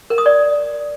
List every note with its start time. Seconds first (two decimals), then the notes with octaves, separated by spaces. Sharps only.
0.10 A#4
0.18 D#6
0.26 D5